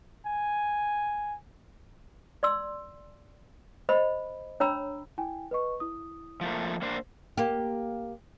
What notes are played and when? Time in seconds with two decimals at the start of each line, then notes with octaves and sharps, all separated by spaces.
0.26 G#5
2.43 D5 C6 E6
3.89 C5 D#5 B5
4.60 D4 C#5 G5 A#5 B5 E6
5.18 E4 G5 G#5
5.51 B4 D#5 C#6
5.80 E4 D#6
6.41 F3 A3 A#3
6.82 A#3 D4 C5
7.37 A#3 G4